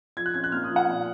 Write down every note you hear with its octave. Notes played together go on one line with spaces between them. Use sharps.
F3 G#6
F#6
C#4 G#6
F#6
A#3 F6
D#6
F3
F#5
A#2